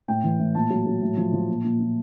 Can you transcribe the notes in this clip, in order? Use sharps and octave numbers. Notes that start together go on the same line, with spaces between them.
A2 G5
E3
A2
A#2 A5
F#3
F#3
A2
F3
F3
A#2
A#2
A#2